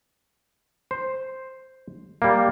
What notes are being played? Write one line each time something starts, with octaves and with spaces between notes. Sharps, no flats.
C5
G3 A#3